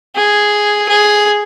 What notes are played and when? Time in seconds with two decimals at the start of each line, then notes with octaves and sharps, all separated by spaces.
0.15 G#4
0.89 G#4